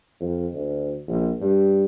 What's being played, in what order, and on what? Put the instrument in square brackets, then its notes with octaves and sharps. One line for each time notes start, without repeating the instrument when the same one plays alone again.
[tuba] F2
D2
A#1
G2